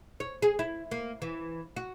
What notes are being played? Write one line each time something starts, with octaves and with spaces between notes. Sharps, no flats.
C#5
G#4
E4
A#3
E3
F#4